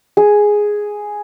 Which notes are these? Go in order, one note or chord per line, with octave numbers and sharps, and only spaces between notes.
G#4